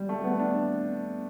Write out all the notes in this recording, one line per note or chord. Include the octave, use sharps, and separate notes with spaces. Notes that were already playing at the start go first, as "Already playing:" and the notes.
Already playing: G3
A3
B3
D4